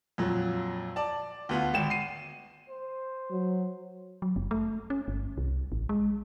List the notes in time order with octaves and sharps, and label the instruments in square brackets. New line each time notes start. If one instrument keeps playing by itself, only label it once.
[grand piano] F2 A#2 F#3
D5 A5
D2 B3 F4
G#1 G5 E7
C7 D#7
[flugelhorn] C5
[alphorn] F#3
[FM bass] F#3
F#1
A3
C#4
G1
C2
A1
G#3